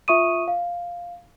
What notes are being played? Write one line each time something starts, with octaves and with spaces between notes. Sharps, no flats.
F4 E5 C#6 D#6 D#7
F5